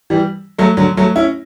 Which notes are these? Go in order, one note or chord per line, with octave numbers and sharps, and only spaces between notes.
E3 G3
F#3 A3
D3 F#3
F#3 A3
C#4 E4